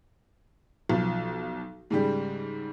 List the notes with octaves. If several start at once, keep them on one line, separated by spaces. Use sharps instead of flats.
B1 F3
G#2 C#3 G3